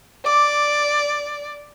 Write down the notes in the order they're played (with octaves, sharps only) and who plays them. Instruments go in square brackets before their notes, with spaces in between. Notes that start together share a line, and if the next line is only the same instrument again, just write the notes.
[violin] D5 [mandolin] D6